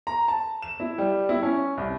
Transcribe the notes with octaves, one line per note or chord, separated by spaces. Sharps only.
A#5
A5
E7
E4
G3
E4
C#4
C2